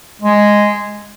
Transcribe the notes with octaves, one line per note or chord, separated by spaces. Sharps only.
G#3